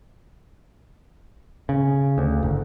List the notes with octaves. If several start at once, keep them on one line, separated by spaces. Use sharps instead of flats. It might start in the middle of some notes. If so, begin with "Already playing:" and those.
C#3
D2
F#1